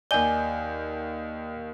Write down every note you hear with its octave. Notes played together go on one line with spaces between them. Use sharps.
D#2 D5 D#5 G#5 G6 G7